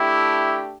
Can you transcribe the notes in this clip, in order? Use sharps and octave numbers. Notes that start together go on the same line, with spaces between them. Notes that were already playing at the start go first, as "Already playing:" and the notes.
Already playing: A3 D4 E4 G4